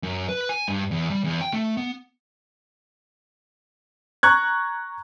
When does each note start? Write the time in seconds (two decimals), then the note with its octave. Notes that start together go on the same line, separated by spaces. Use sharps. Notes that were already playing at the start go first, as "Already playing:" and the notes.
0.03 F#2
0.29 B4
0.49 G#5
0.68 G2
0.91 E2
1.10 G3
1.24 E2
1.41 G5
1.53 A3
1.77 B3
4.23 A#5 C#6 F#6 G#6